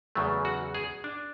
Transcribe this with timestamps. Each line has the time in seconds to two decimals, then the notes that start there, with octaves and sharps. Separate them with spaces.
0.15 E2 C#3 F#3 A3
0.45 F#4
0.74 G#4
1.04 D4